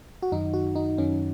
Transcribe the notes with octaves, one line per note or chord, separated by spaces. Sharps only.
F#4
F#2 D#3 D#4
F#4
D#4
F#2 D#3 C#4